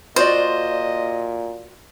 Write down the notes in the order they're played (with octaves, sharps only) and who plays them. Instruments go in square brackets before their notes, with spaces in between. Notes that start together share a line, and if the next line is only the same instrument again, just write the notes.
[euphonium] A#2 [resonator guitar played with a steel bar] F4 F#4 D5 [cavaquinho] C5 [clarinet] D#5